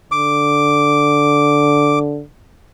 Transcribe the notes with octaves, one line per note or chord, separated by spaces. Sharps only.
D3 D6